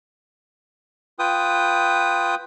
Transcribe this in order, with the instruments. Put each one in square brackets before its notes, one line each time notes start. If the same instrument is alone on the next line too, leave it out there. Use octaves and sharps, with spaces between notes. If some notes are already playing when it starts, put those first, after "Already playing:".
[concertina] F4 B4 G5 D#6